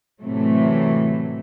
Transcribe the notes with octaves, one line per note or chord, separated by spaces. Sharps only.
A2 C3 E3 F#3 A3